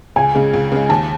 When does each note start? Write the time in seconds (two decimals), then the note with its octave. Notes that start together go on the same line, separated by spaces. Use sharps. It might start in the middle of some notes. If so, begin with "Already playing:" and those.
0.16 C#2 G#5
0.35 C#3 G#3
0.53 C#2
0.72 C#3 G#3
0.89 D#2 A5